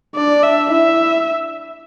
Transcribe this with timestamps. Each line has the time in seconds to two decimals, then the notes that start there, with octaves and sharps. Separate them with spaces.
0.15 D4 D5
0.44 E5
0.72 E4 E5